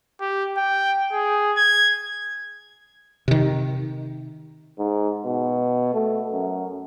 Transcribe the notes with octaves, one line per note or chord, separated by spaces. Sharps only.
G4
G5
G#4
G#6
C3 D#3
G#2
B2
A3
F#2